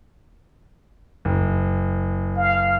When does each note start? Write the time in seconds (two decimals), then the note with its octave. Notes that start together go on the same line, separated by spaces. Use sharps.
1.25 F#1
2.37 F5